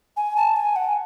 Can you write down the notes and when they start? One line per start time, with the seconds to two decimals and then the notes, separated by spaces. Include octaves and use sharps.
0.17 G#5
0.36 A5
0.56 G#5
0.76 F#5